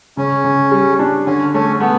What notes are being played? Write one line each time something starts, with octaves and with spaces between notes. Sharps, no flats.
C#3 C#4
C#3
G3
D4
D3 C#4
A3 C#4
A3 B3